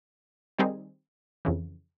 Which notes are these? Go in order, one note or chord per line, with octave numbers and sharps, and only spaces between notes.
D#3 G3 C4 D#4 G#4
F2 C#3 E3